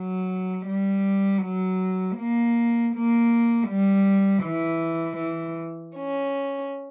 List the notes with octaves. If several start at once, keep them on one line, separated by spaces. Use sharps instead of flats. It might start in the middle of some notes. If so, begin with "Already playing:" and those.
Already playing: F#3
G3
F#3
A#3
A#3
G3
E3
E3
C#4